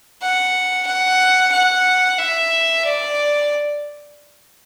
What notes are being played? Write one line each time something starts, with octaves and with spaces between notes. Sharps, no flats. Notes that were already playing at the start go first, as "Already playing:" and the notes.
F#5
F#5
F#5
E5
D5